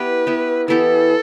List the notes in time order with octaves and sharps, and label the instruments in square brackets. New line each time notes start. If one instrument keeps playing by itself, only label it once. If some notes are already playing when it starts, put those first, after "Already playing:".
Already playing: [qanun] B3 E4 G4 [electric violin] B4
[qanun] B3 E4 G4
[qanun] E3 B3 E4 G4 [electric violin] A4